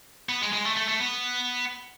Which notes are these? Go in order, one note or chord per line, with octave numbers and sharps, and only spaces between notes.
B3
G#3
G#3
A3
A3
A3
B3